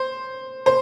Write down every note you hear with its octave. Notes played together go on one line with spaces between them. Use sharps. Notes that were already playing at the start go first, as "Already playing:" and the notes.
Already playing: C5
C5